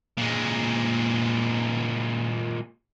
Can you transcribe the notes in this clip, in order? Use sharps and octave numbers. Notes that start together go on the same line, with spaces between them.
A#2 G#3